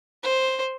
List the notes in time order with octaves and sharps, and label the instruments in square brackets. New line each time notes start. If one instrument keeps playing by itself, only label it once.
[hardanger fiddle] C5